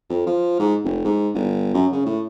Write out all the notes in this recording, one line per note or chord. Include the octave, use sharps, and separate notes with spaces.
F2
F3
G#2
F1
G#2
G1
F#2
C#3
A2